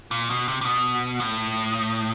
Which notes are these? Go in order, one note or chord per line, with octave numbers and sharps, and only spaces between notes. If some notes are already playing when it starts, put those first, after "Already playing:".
A#2
B2
C3
C3
B2
A2